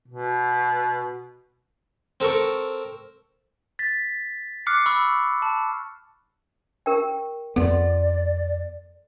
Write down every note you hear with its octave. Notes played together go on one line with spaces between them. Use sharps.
B2
C4 A4 A#4 C#6
A6 B6
D6 F6 F#6 C7 C#7
B5 C#6 E6
A5
G4 A#4 G5
F2 B3 A4 D5 C6